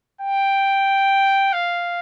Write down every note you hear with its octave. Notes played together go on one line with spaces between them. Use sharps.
G5
F5